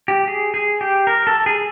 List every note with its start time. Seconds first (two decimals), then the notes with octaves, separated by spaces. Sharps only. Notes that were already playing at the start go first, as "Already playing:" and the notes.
0.08 G4
0.27 G#4
0.54 G#4
0.81 G4
1.07 A#4
1.27 A4
1.46 G#4